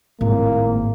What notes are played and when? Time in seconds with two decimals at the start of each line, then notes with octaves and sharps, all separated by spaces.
0.21 G#1 A2 A#3